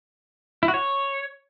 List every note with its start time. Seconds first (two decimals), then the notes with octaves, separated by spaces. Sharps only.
0.63 E4
0.68 F#4
0.74 C#5